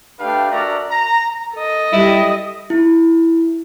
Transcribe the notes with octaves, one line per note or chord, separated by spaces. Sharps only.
A3 D4 G4 B4 F5 G5
D4 F#4 A#4 D5 E5 A#5
A#5
A4 D#5
G3 E4
E4